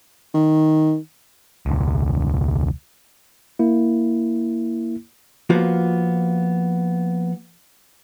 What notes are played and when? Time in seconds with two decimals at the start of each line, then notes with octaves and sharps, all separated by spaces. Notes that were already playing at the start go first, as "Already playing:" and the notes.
0.34 D#3
1.66 E1 C#2
3.59 A#3 E4
5.50 F3 A#3 B3 F4 F#4